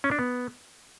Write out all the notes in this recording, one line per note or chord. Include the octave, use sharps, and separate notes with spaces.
C#4
D4
B3